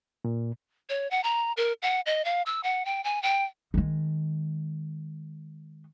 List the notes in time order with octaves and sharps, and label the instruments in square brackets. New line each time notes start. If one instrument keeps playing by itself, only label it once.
[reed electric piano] A#2
[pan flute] C#5
F#5
A#5
A#4
F#5
D#5
F5
E6
F#5
G5
G#5
G5
[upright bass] D#3 G#3